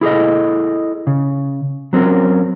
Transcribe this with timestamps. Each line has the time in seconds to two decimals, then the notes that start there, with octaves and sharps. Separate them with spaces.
0.01 E4 G#4 A4 D#5
1.07 C#3
1.93 F#3 C4 C#4 A#4